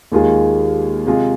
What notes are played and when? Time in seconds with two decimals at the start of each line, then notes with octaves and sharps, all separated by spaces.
0.12 D#2 D#3 G#3 F4 G#4
1.06 C3 G#3 F4 G#4